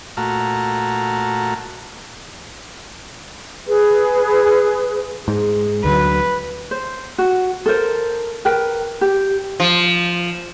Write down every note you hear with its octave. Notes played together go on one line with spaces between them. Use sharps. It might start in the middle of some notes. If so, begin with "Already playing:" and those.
A#2 A3 F#4 A5 A#5 F6
G#4 B4
G#2 G#3
D2 D3 F#3 B4
C5
F#4
A4 A#4 C5
A#4 B4 G5
G4
F3